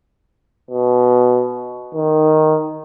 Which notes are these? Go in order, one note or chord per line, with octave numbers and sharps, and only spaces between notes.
B2
D#3